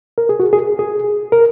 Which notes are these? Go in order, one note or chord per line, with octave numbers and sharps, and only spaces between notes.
A#4
G#4
F#4
G#4
G#4
A#4